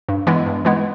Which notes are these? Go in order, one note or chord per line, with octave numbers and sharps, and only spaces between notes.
G2
E3 G#3 B3 E4
G2
E3 G#3 B3 E4